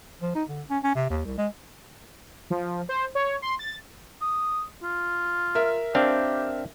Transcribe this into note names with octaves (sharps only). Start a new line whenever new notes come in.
F3
D#4
D3
C#4
C#4
C3
D#2
C2
G#3
F3
C5
C#5
C6
A6
D#6
F4
A#4 E5
C4 D4 G4 F5